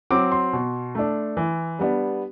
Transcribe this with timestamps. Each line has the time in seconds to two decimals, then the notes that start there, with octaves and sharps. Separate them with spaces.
0.11 F#3 C4 D6
0.32 C6
0.53 B2
0.95 A3 D4
1.37 E3
1.79 G3 B3 D4